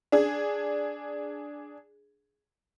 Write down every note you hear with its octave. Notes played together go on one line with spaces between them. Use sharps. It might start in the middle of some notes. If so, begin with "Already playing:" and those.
D4 G#4